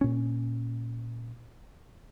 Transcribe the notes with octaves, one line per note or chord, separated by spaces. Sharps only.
A#2 C#4